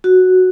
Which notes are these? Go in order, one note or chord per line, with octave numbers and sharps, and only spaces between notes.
F#4